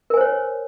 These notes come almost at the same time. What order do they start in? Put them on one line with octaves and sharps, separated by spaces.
A#4 G#5 C5 C#5